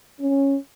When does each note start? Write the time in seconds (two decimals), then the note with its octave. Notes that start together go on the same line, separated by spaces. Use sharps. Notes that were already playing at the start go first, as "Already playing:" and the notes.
0.20 C#4